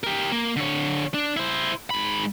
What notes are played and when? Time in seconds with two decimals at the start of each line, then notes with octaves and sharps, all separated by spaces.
0.04 G4 A#4
0.32 A#3
0.56 D3 C#5
1.14 D4
1.37 E4 C5
1.90 G#2 B5